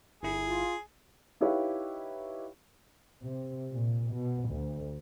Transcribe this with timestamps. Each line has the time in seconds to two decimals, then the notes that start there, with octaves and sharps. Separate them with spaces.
0.23 G1 E4 G#4
0.46 F4
1.41 D#4 E4 G4 B4 C#5 F5
3.24 C3
3.71 A#2
4.11 B2
4.49 D2